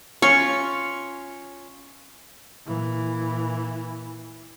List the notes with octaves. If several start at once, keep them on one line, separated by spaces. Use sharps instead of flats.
C#4 F4 C#6
A#2 E3